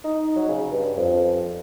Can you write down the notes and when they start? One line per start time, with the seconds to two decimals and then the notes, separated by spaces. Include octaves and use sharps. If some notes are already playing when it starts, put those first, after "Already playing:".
0.04 D#4
0.36 F#3
0.49 C#3
0.72 G2
0.97 F2